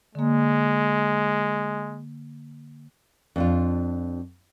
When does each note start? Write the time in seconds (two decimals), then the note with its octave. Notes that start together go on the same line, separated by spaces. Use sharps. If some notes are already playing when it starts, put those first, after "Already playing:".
0.15 D3 G#3 A#3
3.36 F2 D4 F4